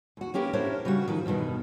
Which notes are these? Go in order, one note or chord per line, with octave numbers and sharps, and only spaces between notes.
D#2 F#4
A#3 C#4 G4 A#4 B4
D4 E4 A#4 C5 C#5
C#3 G3 F#4
D#3 F3 E4
E2 G2 B2 D#3